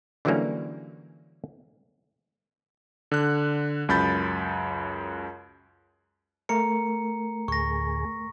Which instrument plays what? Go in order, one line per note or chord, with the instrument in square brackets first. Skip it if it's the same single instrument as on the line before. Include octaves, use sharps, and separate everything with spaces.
[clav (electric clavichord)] D3 E3 F#3 G3 A#3 C#4
[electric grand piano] D3 F#6
C#2 F#2 B5 G6 A6
[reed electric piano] A3 A#4 [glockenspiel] A#5 C#7
[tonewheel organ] D2 A2 G#4 [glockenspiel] C#6 A#6